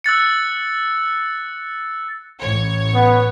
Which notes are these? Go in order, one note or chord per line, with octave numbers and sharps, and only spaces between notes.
E6 F#6 A6 C#7
A1 C#5
B3